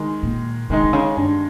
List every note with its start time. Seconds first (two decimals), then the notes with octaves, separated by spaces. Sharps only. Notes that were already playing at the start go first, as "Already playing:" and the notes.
Already playing: D#3 G#3 D#4
0.23 A#2
0.70 C3 D#3 G#3 D#4
0.84 C3
0.93 C#3
1.17 G2